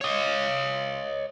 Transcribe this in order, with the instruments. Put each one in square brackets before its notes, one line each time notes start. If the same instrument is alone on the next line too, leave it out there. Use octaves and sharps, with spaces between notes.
[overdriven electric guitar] C#5 D#5